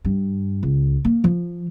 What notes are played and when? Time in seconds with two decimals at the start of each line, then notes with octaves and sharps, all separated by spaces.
0.05 G2
0.63 C#2
1.05 A#3
1.24 F3